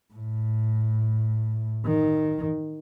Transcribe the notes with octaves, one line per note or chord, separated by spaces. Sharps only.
A2
D#3